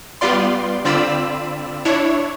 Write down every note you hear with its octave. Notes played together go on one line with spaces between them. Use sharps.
G3 B3 F4 D5 C6
D3 C4 F4 D5 B5 E6
D4 E4 C#5